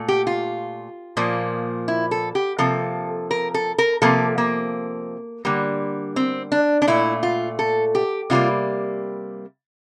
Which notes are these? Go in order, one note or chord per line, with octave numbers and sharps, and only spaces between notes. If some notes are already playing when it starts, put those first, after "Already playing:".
Already playing: A#2 A3
G4
F4
A#2 F3 A#3
E4
A4
G4
C3 F3 A#3 A4
A#4
A4
A#4
C3 F3 A#3 A4
A#3
D3 G3 A#3
C4
D4
D4
A#2 A3 E4
F4
A4
G4
C3 G3 A#3 F4